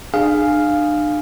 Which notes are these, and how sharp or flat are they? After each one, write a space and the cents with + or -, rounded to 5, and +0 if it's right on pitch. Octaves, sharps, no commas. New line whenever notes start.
D4 +40 G#4 +0 F5 +0